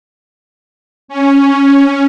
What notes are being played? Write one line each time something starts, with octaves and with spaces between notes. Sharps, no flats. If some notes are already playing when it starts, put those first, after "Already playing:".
C#4